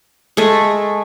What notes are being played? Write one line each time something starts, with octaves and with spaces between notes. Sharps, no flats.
G#3 A3